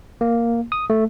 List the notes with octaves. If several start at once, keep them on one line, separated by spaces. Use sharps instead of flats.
A#3
D#6
A3